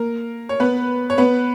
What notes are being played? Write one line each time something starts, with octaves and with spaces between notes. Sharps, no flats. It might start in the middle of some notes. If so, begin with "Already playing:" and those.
Already playing: A#3 A#4
C#5
B3 B4
C#5
B3 B4